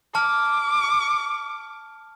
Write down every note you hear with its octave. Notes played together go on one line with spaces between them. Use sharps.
A5 D6 F6